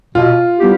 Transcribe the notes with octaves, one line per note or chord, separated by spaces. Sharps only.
B2 F4
G3 B3 E4 G4